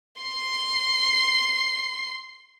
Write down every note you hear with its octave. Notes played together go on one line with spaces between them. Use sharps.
C6 C7